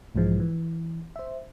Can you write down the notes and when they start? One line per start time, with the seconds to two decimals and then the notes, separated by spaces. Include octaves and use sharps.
0.15 B1 G#2 E3 F3 G#3
0.40 E3
1.16 C5 E5